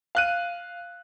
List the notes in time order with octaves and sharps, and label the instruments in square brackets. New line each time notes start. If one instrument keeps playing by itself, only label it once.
[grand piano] F5 F#6 D#7